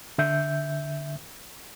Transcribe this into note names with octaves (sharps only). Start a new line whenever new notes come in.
D3 E5 G6